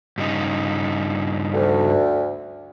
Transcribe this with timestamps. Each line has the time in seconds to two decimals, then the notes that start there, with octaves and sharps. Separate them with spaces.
0.18 G2 C#3 D#4
1.53 D2